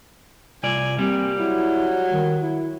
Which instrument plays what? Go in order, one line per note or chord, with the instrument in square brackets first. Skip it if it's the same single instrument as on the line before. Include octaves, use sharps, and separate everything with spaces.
[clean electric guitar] C2 F4 D5 [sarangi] G#5
[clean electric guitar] G3 [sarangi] A#3 [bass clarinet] C4
[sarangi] F#3 [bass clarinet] E4
[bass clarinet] D#3
E4